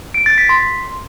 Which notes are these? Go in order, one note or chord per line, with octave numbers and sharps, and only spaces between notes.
D7
A6
B6
C6